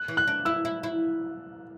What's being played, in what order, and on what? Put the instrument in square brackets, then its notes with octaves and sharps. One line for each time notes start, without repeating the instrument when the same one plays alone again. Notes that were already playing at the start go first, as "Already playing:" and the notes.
Already playing: [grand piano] F#6
[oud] E3
[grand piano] F#6
[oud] D4
[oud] E4 [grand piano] E6
[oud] E4
E4